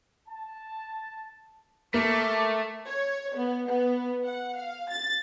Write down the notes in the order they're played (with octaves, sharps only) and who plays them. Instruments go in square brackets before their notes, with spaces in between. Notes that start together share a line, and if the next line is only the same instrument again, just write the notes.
[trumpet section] A5
[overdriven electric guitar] A3 [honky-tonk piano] A#3 [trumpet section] A#4 E5 A5 [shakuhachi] D6
[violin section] C#5
B3
B3
F#5
F5
A6